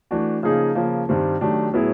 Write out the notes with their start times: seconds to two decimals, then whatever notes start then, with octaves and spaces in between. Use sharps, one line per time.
0.11 E3 A3 D4 F#4
0.43 C#3 F3 A#3 D#4 G#4
0.75 C#3 F3 A#3
1.09 G2 D#3 G3 C4
1.41 D#3 F#3 A3 D4 G4
1.73 A2 F#3 B3 E4 G#4